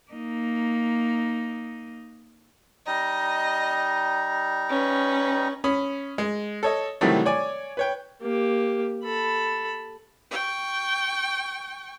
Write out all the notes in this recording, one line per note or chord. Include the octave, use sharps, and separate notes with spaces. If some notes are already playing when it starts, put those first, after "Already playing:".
A#3 D#4
G3 D#4 D#5 A#5
C#4 B4
C#4 B5 D#6
G#3
A4 C#5 D#5
C3 D#3 E3 F#3 G3 A3
C#5 D5 G#5
B4 C#5 G5
A#3 G4
A4 B5
G5 C#6